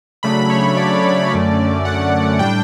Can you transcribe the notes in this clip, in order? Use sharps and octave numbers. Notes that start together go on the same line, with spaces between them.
C#3 F#3 A3 D4 B5
C#5
D5
F#2 D3 A3 C#4
F#5
A2 G3 D4 G5